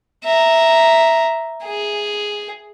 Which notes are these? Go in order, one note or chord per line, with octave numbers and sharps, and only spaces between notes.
E5 A#5
G#4